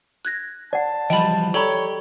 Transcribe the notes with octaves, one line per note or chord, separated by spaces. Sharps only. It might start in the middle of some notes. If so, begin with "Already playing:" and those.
F#6 G#6 A#6
D5 F#5 A5
E3 F3 G3 D#5 G5 B5
G4 A4 C#5 D5 A#5 B5